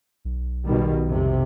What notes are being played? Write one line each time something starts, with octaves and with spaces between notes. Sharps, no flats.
B1
B2 D#3 G3
F2 C3